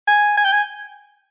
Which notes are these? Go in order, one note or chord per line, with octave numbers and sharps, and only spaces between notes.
G#5
G#5
G5
G#5